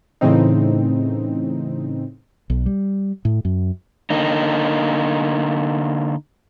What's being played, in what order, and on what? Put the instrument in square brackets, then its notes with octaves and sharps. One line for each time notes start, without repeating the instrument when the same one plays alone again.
[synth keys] A2 C#3 E3 C4 D#4
[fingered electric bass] B1
G3
A2
F#2
[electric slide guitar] D3 A#3 D#4